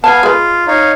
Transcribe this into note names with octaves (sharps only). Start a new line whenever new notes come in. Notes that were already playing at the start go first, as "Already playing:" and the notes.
B3 F5 G#5 A5
G#3 F4 B4
D#4 C#5 F5